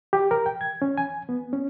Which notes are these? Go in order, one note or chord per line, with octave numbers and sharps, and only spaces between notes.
G4
A#4
G5
G#6
C#4
G#5
B3
C#4